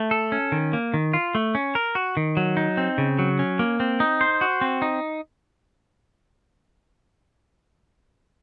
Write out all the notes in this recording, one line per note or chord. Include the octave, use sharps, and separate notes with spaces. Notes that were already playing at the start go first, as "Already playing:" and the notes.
Already playing: A3
A4
C#4
D#3
A#3
D#3
F4
A3
C#4
A#4
F#4
D#3
F#3
D#4
C4
C#3
F#3
C#4
A#3
C4
D#4
C5
F#4
C4
D#4